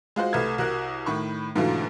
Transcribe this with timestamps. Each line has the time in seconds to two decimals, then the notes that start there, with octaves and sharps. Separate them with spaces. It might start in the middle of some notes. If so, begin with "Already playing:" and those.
0.16 G#3 F4 F#4 C5
0.33 C2 A3 B4 F6 G#6
0.58 C2 F#4 A#4 F#6
1.06 A2 D#3 B5 C#6
1.56 G#2 B2 D3 E3 A3 F4